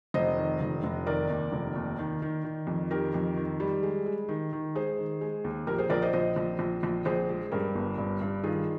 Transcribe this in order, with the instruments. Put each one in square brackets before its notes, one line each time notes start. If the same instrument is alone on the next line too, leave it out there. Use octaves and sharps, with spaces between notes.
[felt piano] F1 C5 D#5
D#3
F1
F1
D#3 A#4 D5
D#2
F1
D#2
D#3
D#3
D#3
F2
D#3 G4 A#4
F2
D#3
G3
G#3
G#3
D#3
D#3
G#3 G#4 C5
D#3
G#3
D#2
A#1 G4 A#4
G#4 C5
A#1 A#4 D5
C5 D#5
A#1 C5 D#5
A#1
A#1
A#1
A#1 G#4 C5
G#3
G2 G4 A#4
G1
G2
G2
D#3 F4 G#4